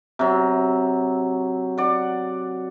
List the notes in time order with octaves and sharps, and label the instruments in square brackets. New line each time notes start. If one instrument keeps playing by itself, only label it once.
[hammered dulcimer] C3 F#3
D5 F#5